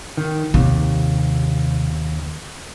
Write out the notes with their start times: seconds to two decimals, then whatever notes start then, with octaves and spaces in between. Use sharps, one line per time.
0.17 D#3
0.54 D#2 C3